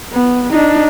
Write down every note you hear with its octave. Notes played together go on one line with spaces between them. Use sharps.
B3
D4 D#4